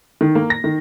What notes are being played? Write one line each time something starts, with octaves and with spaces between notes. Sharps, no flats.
D#3
A#3
A#6
D#3